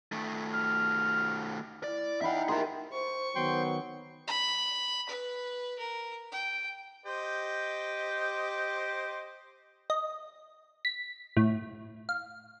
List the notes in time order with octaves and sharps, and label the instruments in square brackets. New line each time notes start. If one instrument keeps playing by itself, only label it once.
[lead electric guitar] D#3 A3
[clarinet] F6
[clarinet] E4 [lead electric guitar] D5
[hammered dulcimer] D#4 G5 B5 [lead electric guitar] E5 F#5
[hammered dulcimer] G4 A#4 C5 [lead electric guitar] G#4 E5
[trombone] C5 [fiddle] C#6
[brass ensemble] D#3 F#3 B3 [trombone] C5 [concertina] G5 C6
[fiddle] B5
B4
A#4
G5
[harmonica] G4 C5 D#5
[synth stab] D#5
B6
A2
F5